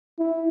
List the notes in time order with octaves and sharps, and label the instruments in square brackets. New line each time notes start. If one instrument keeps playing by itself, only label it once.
[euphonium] E4